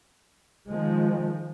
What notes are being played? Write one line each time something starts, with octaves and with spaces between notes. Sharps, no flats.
D#3 F3 G#3